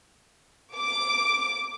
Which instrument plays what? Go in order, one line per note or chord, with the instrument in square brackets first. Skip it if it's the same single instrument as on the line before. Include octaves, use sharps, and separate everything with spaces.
[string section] D6